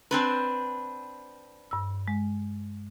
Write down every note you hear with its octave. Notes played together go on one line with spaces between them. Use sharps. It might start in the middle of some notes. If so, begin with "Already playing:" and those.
C4 D4 B4 A#5
G2 E6
G#3